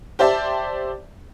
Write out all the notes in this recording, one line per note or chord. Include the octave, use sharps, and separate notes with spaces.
G4 C5 D5 E5 A5